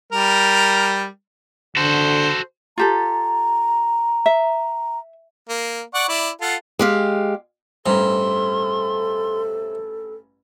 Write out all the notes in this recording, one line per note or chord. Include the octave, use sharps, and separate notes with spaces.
G3 A#4
D3 F#4 A4 C5
F4 G4 A4 A#5
E5
A#3
D5 F#5 C#6
E4 D5
F4 A4 F#5
G#3 G4 F5
A1 G2 C3 A4 A#5 C6